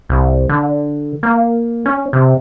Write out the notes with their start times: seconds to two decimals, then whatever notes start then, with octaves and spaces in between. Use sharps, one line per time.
0.09 C2
0.49 D3
1.23 A#3
1.86 C#4
2.13 C3